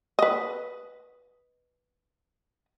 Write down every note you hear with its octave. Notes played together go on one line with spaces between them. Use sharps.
B4 D#5